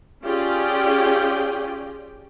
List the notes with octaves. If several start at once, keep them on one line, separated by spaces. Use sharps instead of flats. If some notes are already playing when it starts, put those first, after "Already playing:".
C#4 F4 G4 G#4 D5 G5